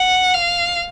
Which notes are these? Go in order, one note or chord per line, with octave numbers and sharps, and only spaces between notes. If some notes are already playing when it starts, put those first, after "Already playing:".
Already playing: F#5
F5